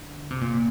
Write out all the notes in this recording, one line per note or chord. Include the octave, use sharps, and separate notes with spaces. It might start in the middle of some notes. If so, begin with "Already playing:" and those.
Already playing: D3
C3
A#2